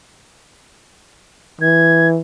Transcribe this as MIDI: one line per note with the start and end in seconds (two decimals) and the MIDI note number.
1.61 2.21 52
1.61 2.08 92